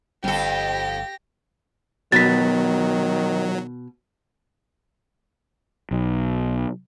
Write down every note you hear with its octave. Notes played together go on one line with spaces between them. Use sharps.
G1 F2 G4 A4 A#6
B2 D#3 F#3 A6 B6
B1